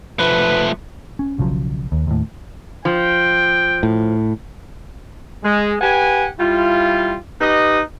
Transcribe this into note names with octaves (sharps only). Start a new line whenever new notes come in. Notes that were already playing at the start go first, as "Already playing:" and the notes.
F3 A3 B4
C#4
B1 C#3 F3 F#3
D#2
D#2 A2
F3 G5
A2
G#3
G4 B4 F#5 G#5
G3 E4 F4
D#4 G4 B4 D#5